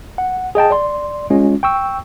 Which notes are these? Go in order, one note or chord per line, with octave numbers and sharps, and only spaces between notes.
F#5
G#4 D#5 G5 A5
D5 C6
G#3 C#4 F4
G5 C#6 E6